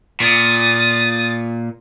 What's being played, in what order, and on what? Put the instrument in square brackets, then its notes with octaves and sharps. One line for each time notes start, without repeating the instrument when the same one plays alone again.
[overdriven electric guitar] A#2 [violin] D#6 A6